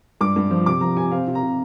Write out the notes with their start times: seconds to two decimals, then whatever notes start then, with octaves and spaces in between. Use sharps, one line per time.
0.21 G2 D6
0.36 G2
0.50 F3
0.66 C3 D6
0.81 F3 A#5
0.97 C3 G#5
1.11 C4 F5
1.28 C3
1.35 A#5
1.42 C3